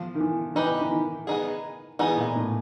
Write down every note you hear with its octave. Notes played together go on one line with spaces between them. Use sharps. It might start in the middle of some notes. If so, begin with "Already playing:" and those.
Already playing: F3
D#3
E3
E3 D#4 G4 B4
E3
D#3
B3 D#4 G#4
E3 B3 D#4 G#4
A#2
A2